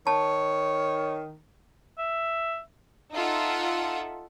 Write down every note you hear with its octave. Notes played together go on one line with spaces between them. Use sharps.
D#3 C#5 A5
E5
D#4 F4 A4 E5 F#5